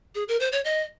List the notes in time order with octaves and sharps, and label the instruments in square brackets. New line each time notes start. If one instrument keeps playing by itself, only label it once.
[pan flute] G#4
A#4
C5
C#5
D#5